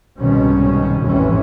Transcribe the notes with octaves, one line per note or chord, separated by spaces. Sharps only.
C2 G#2 B2 D#3 C#4
A1 F2 G#2 E3 C#4